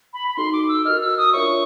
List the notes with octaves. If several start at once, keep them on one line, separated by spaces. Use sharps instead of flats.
B5
B5
D#4 F#4 A4 C6
D6
E6
F#4 A#4 D#5 F6
E6
D#6
D4 F4 A#4 C#5 E5 C#6